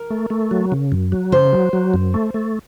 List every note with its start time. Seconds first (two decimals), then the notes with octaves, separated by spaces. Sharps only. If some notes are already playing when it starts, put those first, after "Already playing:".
Already playing: A#4
0.11 A3
0.30 A3
0.51 F#3
0.72 C#3
0.92 F#2
1.12 F#3
1.32 C#3 C5
1.53 F#3
1.73 F#3
1.94 F#2
2.14 A3
2.34 A3